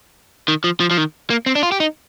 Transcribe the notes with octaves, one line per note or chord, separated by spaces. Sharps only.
D#3
F3
F3
F3
D#3
A#3
C4
D4
F4
G4
D#4